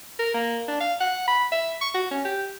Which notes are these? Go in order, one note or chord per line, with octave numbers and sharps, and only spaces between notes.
A#4
A#3
D4
F5
F#5
B5
E5
C#6
F#4
C#4
G4